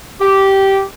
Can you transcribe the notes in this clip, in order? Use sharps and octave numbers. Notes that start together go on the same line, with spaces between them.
G4